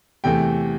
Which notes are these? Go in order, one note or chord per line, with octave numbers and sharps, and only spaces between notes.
E2 C3 E3 A3 G5